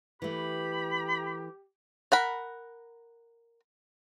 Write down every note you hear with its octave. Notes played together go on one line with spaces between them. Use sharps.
E3 A3 G4 B5
A#4 F#5 B5